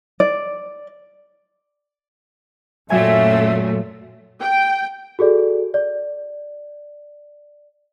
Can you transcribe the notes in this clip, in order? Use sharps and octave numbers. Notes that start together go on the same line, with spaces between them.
D5
F#2 A#2 F#3 A3 E5 G#5
G5
F#4 G#4 A4 D5
D5